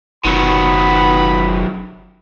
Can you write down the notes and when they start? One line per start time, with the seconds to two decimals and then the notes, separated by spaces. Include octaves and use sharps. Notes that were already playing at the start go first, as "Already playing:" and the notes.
0.25 F#1 D#3 F#3 B3 B5